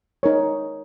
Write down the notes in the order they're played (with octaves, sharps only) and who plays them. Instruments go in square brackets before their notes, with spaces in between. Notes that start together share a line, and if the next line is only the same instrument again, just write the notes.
[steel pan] D#4 A#4 C#5